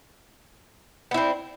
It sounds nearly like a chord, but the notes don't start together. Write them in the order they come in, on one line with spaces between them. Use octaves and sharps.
B3 E4 C4